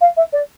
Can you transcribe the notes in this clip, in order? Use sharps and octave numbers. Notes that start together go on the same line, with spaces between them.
F5
E5
D5